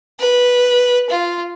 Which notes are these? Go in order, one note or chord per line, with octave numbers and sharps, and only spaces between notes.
B4
F4